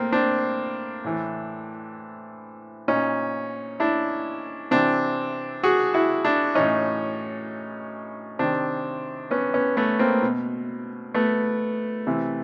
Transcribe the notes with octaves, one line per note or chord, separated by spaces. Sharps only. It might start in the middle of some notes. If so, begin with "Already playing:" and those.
Already playing: A2 A#3 C4
C4 D4
A2 E3
A#2 C#4 D#4
D4 E4
C3 E3 C4 D4
F#4 G#4
E4 F#4
D4 E4
A2 E3 C#4 D#4
C3 D#3 C4 D4
B3 C#4
B3 C#4
A3 B3
A#3 C4
B2
A3 B3
C3 E3